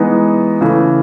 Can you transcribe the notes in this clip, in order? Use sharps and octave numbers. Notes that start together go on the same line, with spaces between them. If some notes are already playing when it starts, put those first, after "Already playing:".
Already playing: E3 G#3 B3 D#4
C#3 E3 A3